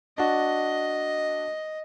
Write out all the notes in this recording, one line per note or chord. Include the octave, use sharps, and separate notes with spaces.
D4 F#4 D#5